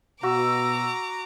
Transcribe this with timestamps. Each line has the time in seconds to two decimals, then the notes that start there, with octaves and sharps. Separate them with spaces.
0.23 B2 F#4 A#5 D6 E6